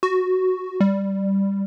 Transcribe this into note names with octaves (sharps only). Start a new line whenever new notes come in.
F#4
G3